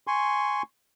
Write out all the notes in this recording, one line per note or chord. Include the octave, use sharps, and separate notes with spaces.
G#5 C6 C#6